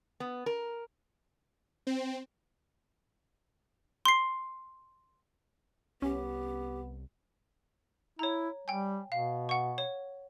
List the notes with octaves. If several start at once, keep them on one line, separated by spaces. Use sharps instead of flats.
B3
A#4
C4
C6 C7
C2 B3 C#4 G4
E4 C#5 A#5
G3 G5 G#5
B2 F5
F#5 C#6
C#5